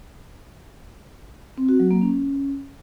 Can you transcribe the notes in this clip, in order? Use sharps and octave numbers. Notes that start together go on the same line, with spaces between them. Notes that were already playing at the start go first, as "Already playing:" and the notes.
C4
F#4
F#3
A#3
C#4